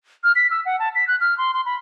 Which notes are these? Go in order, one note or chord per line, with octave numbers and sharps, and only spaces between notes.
F6
B6
E6
F#5
A5
B6
F#6
F6
C6
C6
B5